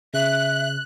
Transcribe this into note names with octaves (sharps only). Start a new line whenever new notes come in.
C#3 E5 F#6